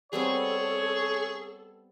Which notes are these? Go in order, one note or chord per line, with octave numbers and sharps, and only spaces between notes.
G3 B3 C4 G#4 A4 C#5